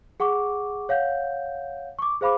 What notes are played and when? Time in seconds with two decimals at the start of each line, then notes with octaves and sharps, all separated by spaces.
0.20 G#4 F#5 C#6 D6
0.89 C#5 F5 F#5 G6
1.99 C#6 D6
2.21 G#4 C5 F5 B5 D6